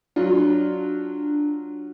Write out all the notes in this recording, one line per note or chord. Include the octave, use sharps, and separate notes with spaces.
F#3 D4 F4